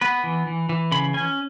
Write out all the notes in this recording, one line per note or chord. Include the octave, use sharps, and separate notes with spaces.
B3 B4
E3
E3
E3
C#3 B5
C#4 G#5